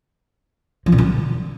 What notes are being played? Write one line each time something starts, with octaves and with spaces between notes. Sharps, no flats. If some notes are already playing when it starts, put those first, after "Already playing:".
F3
A#2
D3